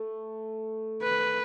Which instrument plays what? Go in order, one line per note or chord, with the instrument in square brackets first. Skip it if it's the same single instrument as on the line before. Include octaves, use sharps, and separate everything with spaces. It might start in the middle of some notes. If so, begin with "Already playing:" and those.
Already playing: [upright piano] A3
[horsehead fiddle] B4